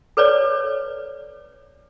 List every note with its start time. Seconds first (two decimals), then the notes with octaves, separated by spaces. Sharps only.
0.17 A4 B4 C#5 D5